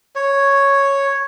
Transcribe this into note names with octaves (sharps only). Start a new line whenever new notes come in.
C#5